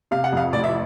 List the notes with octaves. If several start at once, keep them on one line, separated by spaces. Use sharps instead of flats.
C3 F5
F#5
F2 F5
A1 D5
E5